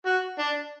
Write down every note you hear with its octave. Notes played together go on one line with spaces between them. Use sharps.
F#4
D4